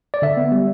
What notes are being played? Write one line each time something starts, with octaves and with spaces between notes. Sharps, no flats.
D5
D3 E5
B3
G3